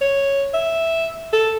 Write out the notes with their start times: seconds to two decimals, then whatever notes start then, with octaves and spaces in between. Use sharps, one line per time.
0.01 C#5
0.54 E5
1.33 A4